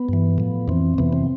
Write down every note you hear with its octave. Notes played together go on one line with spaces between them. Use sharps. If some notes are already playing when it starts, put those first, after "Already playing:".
Already playing: B3
G2 E3
A2 F3
F2 E3 C4
F2 C3 E3 B3
C4